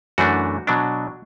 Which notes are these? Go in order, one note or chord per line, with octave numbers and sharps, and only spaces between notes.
F#2 E3 A3 D4 F#4
B2 F#3 D4